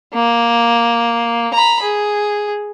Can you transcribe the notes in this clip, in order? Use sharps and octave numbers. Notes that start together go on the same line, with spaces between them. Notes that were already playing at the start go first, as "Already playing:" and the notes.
A#3
A#5 B5
G#4